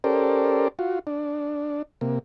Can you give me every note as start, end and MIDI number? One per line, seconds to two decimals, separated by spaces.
0.04 0.68 61
0.04 0.68 67
0.04 0.68 69
0.04 0.68 70
0.04 0.68 72
0.04 0.68 74
0.79 0.99 65
0.79 0.99 66
1.07 1.82 62
2.01 2.19 48
2.01 2.19 58